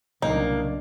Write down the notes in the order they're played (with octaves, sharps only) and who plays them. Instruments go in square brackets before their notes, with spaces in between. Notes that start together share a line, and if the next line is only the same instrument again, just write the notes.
[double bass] C2 D4 [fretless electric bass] A#2 C#3 F#3 [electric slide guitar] A#3 [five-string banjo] D#4